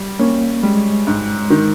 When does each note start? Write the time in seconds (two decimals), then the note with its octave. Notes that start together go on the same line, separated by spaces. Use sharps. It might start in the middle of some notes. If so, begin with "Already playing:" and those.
Already playing: G3
0.19 A#3 C#4
0.63 G3 G#3
1.07 G#2
1.50 D#3